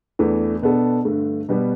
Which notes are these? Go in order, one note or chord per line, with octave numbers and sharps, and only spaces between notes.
E2 E3 A3 D4
B2 B3 D4 A4
G2 D3 A3
B2 G3 B3